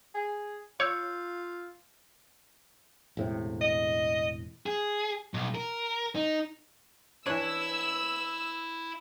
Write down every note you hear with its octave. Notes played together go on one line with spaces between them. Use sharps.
G#4
F4 C#5 E6 G6
E1 A2 C3
D#5
G#4
B1
A#4
D#4
E3 D4 E4 C#5 E6